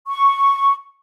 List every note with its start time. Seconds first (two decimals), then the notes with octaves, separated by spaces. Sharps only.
0.08 C#6